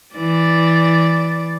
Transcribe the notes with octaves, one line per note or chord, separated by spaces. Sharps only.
E3 D5